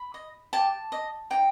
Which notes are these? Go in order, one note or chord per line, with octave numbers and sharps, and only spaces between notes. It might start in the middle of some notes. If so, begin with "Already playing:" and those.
Already playing: B5
D#5
G4 A5
D#5
D#4 G5